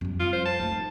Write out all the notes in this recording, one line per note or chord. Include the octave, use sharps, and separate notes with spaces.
F2 G3
F4
C5
A5
A3 D#4